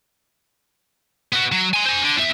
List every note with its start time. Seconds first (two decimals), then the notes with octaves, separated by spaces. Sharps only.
1.33 B3 F#4
1.52 F#3
1.73 G#5 C6
1.85 C5 G#5
2.02 D3
2.16 E2 E5